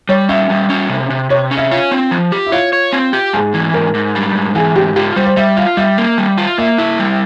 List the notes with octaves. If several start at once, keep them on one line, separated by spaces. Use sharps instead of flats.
G3 C#5
C#4 E5
G3
C#4
C3
C3
C3 C#5
C#4
E5
F4 C#5
C4
F3
G4
E4
F4 C#5
C#5
C4
G4
G#2 G#4
E3
G#2 A#4
G#2
G3
G#2
E3 G#4
G#2 G4
F4 G4
G3 C5
C5
G3 E5
F4 F5
G3 E5
A#3
G3
F4
A#3 E5
E4
G3